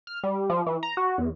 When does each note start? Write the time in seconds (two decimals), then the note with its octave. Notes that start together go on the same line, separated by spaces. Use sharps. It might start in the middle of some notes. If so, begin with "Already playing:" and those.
0.07 F6
0.23 G3
0.50 F3
0.66 E3
0.83 A#5
0.97 F#4
1.18 E2